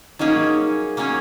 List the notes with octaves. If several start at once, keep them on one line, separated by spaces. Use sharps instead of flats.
F#3 A#3 C#4 D#4 G#4
F#3 A#3 C#4 G#4